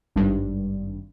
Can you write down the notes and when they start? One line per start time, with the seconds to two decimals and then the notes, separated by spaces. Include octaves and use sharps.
0.16 G#1 G2